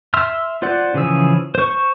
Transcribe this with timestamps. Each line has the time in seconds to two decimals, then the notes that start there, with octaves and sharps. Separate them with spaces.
0.14 E5 C6 E6 F6
0.62 F4 C5 D5 F#5
0.94 C#3 E3 F3 G#4 E6
1.55 C5 C#6